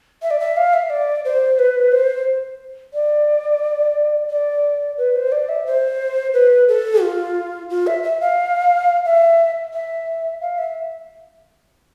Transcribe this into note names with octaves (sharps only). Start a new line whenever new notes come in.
E5
D5
E5
F5
E5
D5
C5
B4
C5
D5
D5
B4
C5
D5
E5
C5
B4
A4
F4
F4
E5
E5
F5
E5
E5
F5
E5